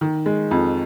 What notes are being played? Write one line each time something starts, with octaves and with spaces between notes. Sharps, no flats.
D#3
G#3
F2